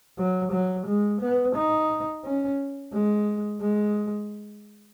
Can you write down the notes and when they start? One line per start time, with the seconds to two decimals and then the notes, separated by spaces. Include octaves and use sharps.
0.18 F#3
0.52 F#3
0.87 G#3
1.21 B3
1.55 D#4
2.24 C#4
2.93 G#3
3.61 G#3